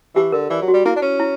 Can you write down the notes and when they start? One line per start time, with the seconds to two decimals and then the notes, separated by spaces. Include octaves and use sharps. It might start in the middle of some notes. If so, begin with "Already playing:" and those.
0.15 E3 G4
0.32 D3 A#4
0.50 E3 D5
0.62 F#3
0.68 F#4
0.74 G3
0.85 A#3 E4
0.96 D4
1.02 C#4
1.20 E4